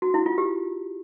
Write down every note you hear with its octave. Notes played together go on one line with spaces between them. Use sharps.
F#4
E4
F4
G4